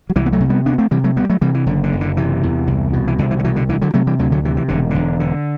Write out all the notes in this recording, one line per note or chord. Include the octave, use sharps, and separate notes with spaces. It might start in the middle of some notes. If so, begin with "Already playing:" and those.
F#3
C2 E3 G3
B3
F#3 A3
C3
G3 B3
D2 B3 D4
A3 C4
C3 E3 G3
F#3 A3
D2 G3 B3
F#3 A3
C3 E3 G3
E3
F#1 D3
D3
F#1
D3
C3 E3
E2
C2
B2
E3
C2 D3
E3
D3
B2 E3
D3
D2 E3
D3 F#3
C3 F#3 A3
E3 G3
D2 D3 F#3
D3 F#3
C3 E3
E3
E1 D3
E1 D3
D3